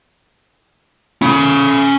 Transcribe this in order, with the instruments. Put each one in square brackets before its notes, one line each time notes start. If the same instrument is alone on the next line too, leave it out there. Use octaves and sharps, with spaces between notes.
[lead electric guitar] C#4 B5